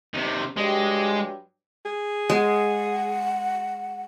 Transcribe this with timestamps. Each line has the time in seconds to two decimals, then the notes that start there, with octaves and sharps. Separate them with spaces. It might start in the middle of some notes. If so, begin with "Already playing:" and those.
0.14 C3 D#3
0.57 G2 F#3 G#3 G4
1.86 G#4
2.30 G#3 F#5